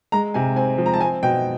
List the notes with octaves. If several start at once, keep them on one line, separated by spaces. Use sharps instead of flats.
G#3 A#5
C3 G#5
C4 G#5
F3
A#5
A5
C4 G#5
B2 G5